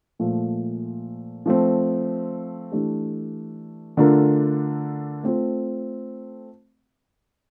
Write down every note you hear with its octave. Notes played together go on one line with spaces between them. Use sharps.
A#2 F3 A3
F3 A3 C4
E3 A3 D4 G4
D3 A3 D4 F4 A#4
A3 C4 F4